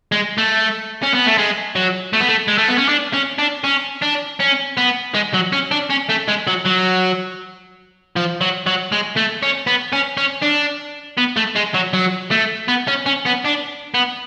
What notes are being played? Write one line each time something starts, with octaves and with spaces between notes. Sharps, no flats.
G#3
A3
C#4
B3
A3
G#3
F#3
A3
B3
A3
G#3
A3
B3
C#4
D4
C#4
D4
C#4
D4
C#4
B3
G#3
F#3
C#4
D4
C#4
A3
G#3
F#3
F#3
F3
F#3
F#3
G#3
A3
C#4
B3
C#4
C#4
D4
B3
A3
G#3
F#3
F#3
A3
B3
C#4
C#4
B3
D4
B3